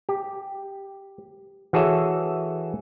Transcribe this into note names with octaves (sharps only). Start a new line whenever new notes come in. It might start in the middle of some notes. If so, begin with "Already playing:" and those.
G4
E3 F#4 G#4 A4 C#5 E5